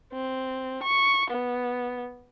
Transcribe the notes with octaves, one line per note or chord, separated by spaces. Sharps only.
C4
C#6
B3